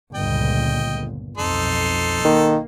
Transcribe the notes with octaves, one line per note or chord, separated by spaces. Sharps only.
G1 C#2 A#2 D#5 G5
B1 F2 D#4 A4 C6
D#3 A#3